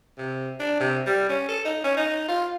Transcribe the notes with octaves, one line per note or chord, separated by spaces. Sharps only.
C3
D4
C3
G3
C#4
A4
D#4
C#4
D#4
F4